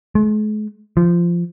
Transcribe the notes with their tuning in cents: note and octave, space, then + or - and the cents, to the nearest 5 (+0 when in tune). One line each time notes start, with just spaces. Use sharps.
G#3 +45
F3 -15